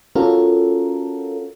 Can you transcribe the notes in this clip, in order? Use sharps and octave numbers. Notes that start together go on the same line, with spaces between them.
C#4 F4 F#4 A4 A#4